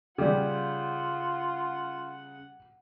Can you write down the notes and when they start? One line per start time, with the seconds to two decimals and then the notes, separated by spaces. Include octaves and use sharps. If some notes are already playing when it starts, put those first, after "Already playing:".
0.18 C#3 G3 F4 G4 F#5